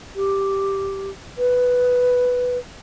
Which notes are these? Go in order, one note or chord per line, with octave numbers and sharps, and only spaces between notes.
G4
B4